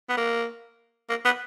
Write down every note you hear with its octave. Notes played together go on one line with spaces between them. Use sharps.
B3
A#3
A#3
B3